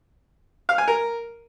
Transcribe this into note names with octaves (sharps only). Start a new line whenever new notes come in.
F5
G#5
A#4